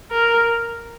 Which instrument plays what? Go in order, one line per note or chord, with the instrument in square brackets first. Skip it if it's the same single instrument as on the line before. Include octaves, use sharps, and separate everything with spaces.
[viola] A#4